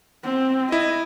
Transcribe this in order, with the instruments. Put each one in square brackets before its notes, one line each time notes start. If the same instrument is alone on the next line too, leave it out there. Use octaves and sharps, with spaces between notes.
[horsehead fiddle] C4
[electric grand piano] E4 [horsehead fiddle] D#5